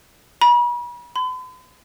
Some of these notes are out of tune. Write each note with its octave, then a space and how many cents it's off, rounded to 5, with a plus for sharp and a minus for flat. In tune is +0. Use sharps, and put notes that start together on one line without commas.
B5 -40
B5 +45